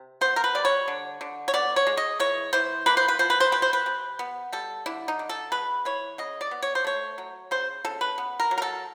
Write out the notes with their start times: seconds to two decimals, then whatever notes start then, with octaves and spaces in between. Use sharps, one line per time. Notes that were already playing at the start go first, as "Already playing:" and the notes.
Already playing: C3
0.21 B3 C5
0.36 A#4
0.44 B4
0.55 G3 D5
0.65 C#5
0.88 D3
1.21 D3
1.48 C#5
1.54 B3 D5
1.76 C#5
1.87 G#3
1.97 D#5
2.20 E3 C#5
2.53 E3 C5
2.86 A#3 B4
2.97 C5
3.08 B4
3.19 F3 C5
3.30 B4
3.40 C5
3.52 C3 B4
3.62 C5
3.73 B4
3.86 C3
4.19 B3
4.52 G3 A4
4.86 D3 E4
5.08 D#4
5.19 D3
5.29 A4
5.52 G#3 B4
5.85 E3 C#5
6.18 C#3 D#5
6.41 D5
6.51 B3
6.62 C#5
6.75 C5
6.84 A3 C#5
7.18 F#3
7.51 C#3 C5
7.85 C#3 A4
8.01 B4
8.18 B3
8.40 A#4
8.51 F#3
8.58 A#4
8.62 A4